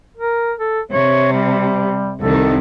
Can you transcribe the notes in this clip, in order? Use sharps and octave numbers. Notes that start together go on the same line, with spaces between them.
A#4
A4
C3 C#5
G3
C2 D#3 A4